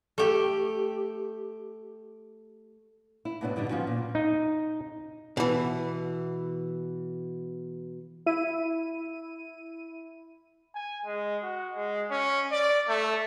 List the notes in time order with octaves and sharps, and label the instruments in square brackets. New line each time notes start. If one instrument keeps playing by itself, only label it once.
[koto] A3 G4
[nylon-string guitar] E4
A2 C3 B3 D4 E4 F#4
G2 D3 G3 B3 D4 D#4
F3 B3 C#4 F4 F#4
A#2
[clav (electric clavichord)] D#4
[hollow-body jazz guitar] B2 E3
[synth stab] E4 D#7
[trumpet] G#5
G#3
F#4
G#3
C#4
D5
A3